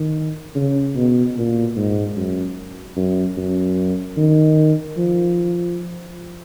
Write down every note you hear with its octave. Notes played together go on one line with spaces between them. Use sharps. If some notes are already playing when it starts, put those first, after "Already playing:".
Already playing: D#3
C#3
B2
A#2
G#2
F#2
F#2
F#2
D#3
F3